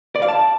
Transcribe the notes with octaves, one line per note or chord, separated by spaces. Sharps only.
D5
F5
A5